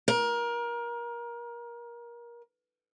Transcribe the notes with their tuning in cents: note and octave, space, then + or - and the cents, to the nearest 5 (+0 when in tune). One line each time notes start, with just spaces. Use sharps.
A#4 +25